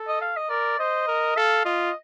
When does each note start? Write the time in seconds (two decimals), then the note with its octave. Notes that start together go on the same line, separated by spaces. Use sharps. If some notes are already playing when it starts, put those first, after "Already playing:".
Already playing: A4
0.08 D#5
0.22 F5
0.37 D#5
0.50 A#4 D5
0.79 C5 D#5
1.08 A#4
1.36 A4 F5
1.65 F4 D#5